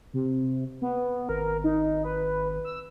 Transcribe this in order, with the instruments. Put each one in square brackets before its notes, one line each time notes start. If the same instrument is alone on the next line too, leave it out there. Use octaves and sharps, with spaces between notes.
[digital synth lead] C3
B3
[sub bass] G#1 [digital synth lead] A#4
[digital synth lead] D#4
B4
E6